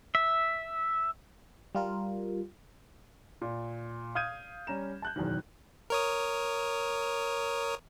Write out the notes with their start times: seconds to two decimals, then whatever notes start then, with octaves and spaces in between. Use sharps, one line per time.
0.15 E5
1.75 G3 F4 A#4
3.41 A#2
4.15 F5 D#6 F6 G6 G#6 D#7
4.67 G3 C#4 A#5 E7
5.02 A5 F#6 G6
5.16 F#1 E2 B2 D#3
5.90 A#4 C#5 D#6